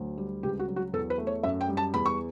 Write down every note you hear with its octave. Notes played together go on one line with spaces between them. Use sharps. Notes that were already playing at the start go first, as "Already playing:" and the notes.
Already playing: D2 F#3
G3
C#2 G4
F#4
F#3
F#4
E2 A4
B4
A3
C#5
F#2 E5
G5
G3
A5
E2 B5
C#6